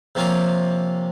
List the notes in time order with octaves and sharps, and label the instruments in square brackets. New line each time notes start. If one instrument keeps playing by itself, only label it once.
[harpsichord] C3 F3 A#3 C#4 F4